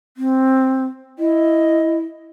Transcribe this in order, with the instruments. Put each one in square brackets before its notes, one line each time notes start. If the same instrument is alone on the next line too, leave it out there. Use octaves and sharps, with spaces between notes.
[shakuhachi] C4
[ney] E4 [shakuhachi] D#5